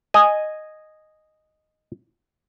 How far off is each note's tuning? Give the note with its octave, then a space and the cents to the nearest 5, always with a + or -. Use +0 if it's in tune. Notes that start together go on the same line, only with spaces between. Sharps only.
D#5 -5 G#5 +0